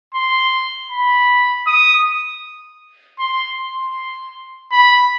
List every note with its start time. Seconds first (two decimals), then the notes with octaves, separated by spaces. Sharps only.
0.14 C6
0.91 B5
1.67 D#6
3.19 C6
3.58 C6
4.72 B5